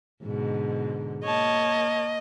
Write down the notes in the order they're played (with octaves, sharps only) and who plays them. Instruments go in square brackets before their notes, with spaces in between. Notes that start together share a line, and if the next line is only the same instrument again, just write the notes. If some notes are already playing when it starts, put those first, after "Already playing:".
[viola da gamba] G#2 B2 D3
[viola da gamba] A#3 [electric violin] C#5 A5 [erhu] D#5